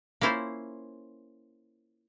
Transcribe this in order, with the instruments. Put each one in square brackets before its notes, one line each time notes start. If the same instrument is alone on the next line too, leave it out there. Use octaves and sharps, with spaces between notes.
[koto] A#3 C#4 E4 F4 C5